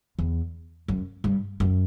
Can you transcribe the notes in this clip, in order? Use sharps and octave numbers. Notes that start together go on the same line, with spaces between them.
E2
F#2
G2
F#2